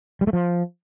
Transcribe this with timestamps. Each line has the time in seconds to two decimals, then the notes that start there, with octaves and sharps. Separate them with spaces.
0.21 G3
0.27 A3
0.33 F3